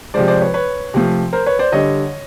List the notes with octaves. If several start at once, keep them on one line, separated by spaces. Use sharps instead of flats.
C3 F3 G#3 C5 D5
C5 D5
B4 C#5
B4 C#5
C3 F3 A3
A#4 C5
B4 C#5
C5 D5
D3 G3 C#5 D#5